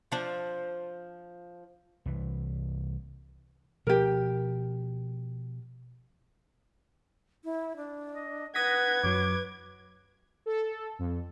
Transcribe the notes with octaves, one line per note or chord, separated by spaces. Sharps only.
F3 D4
C2 E3
B2 F3 G4 A#4
E4
D4
D#5
B4 F#5 D#6 G#6 A#6 B6
F#2 F#3 D6
A4
F2